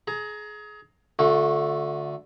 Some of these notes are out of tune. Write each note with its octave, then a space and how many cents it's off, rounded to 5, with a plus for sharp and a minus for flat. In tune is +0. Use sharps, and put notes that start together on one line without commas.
G#4 +25 A#5 +0
D3 +0 A3 +0 F#4 -40